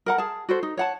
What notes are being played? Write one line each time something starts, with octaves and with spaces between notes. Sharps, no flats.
A#4 F#5 A#5
G#4 A5
F#4 A4 C5
D#4
C#5 F#5 A5